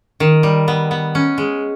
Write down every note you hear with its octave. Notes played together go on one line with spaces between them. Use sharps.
D#3
G3
B3
B3
C#4
G#3